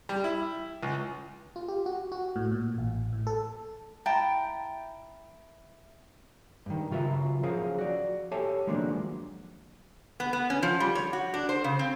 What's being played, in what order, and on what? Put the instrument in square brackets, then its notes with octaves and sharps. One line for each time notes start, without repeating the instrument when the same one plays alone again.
[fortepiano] G3
E4
C#2
[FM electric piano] F4
G4
F#4
F#4
A2
A#2
A1
A2
A4
[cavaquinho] E4 G5 A5 A#5
[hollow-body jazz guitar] G2 D#3
C#3 F#3 F4 A#4 B4 E5
F3 F#3 C#4 G#4 A#4 F5
F#4 D5
G4 A4 C#5 E5 G#5 A5
D#3 F3 F#3 G#3 A#3 D4
[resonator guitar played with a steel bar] B3
B3
C#4
F3
G3
C#5
F#4
D4
C5
C#3
C4